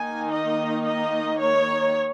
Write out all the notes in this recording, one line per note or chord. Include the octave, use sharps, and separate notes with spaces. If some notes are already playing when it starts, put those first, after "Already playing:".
Already playing: D#3 A#3 D#4 G#5
D#5
D#5
C#5